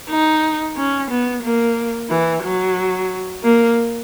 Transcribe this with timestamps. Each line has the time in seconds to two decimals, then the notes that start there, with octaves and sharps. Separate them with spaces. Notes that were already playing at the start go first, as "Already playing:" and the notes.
0.09 D#4
0.76 C#4
1.10 B3
1.43 A#3
2.10 E3
2.43 F#3
3.43 A#3